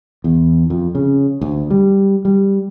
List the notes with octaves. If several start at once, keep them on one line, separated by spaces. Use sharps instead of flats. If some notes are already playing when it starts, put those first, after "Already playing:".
E2
F2
C#3
D2
G3
G3